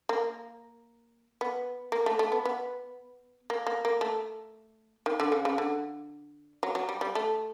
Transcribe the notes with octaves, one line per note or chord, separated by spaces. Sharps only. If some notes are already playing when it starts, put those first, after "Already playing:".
A#3
B3
A#3
A3
A3
B3
B3
A#3
A#3
A#3
A3
D#3
D3
C#3
C#3
D3
F#3
F#3
G3
G3
A3